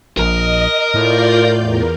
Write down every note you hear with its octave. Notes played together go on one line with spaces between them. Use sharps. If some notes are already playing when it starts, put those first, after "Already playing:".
A#1 A#4 D#5 A#5
A2 F4 D5 G6
E2 A#4